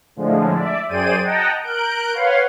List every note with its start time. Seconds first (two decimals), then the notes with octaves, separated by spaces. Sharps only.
0.16 A2 D3 F3 G#3
0.53 D5 E5
0.89 F#2 G#4 C5 D5 G5 D#7
1.23 D#5 F#5 G5 A5 A#5
1.62 A#4 F#6 G6 D7
2.13 B4 C#5 F5 F#5 C6